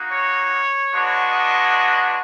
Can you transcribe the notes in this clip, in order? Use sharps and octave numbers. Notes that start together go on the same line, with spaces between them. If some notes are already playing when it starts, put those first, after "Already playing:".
Already playing: A#3 D#4 F#4
C#5
G#3 B3 D4 F#4
D#5